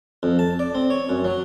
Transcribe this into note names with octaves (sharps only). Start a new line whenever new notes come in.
F2
A5
D5
C4
C#5
F#2
F#3